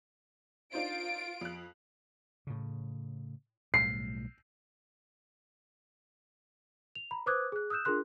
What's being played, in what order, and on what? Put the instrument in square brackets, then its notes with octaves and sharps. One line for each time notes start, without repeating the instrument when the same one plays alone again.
[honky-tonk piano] D4 D#4 C5 [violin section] F4 D7
[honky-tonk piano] F2 F#6
[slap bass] A2 C#3
[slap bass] B1 A2 G3 [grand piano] C7
[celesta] F7
A#5 B5
B4 C5 D6 D#6 F#6 G#6
G#4 F#6
D#6 E6 F#6 G6 E7
D4 F4 G#4 A#4 C6 F#6